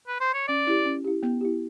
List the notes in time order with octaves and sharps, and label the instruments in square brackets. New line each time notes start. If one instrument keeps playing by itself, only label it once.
[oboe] B4
C5
C#5
[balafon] C#4 [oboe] D5
[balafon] E4 G4
C#4
E4 G4
B3
E4 G4